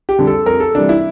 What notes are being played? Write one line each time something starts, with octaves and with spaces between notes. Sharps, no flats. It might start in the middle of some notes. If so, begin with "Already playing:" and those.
G4
F2 D3 G3
A4
F2 A#4
A4
C3 E3 G3 D4
E4